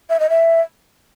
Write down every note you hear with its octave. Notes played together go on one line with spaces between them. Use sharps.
E5
D#5
E5